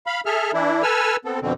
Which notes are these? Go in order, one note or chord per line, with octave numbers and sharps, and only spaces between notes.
F5 B5
G#4 A4 E5 F6
E3 D4 E4
A4 B4 G#5 E6 F6
B3 C4 A4
F2 B2 D3 C4